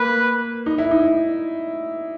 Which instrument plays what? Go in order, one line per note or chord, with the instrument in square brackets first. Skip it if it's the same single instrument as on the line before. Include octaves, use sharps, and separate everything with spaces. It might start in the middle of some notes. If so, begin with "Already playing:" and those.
Already playing: [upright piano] A#3 [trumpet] B4
[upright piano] D#4
E4
D#4